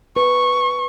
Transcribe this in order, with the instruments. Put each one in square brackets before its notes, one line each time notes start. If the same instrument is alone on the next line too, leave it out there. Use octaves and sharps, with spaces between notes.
[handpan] B4 [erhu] C#6